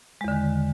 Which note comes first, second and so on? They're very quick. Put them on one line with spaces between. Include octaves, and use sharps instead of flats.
G#3 E2 D3 D#3